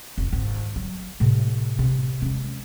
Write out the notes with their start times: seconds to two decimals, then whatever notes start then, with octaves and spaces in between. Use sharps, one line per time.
0.18 F1
0.32 G#1 E4
0.76 F#3
1.20 A2 C3
1.79 C3
2.22 G#3 C#4